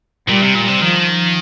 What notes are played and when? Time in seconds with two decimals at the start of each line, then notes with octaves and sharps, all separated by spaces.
0.29 A#2 G3
0.42 C3
0.55 A#2
0.68 C3
0.81 D#3 F3